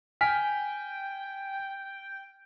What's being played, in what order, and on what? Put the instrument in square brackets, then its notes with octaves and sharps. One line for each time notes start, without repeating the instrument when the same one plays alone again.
[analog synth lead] G5 [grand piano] G#5 F6 B6